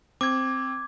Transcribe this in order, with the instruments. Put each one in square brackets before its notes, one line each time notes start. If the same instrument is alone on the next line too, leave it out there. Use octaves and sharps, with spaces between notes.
[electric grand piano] C4 [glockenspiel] D6 G#6